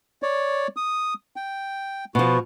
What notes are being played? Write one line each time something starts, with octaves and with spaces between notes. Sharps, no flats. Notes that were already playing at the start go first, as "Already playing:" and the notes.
C#5 D5
D#6
G5
B2 F3 F#4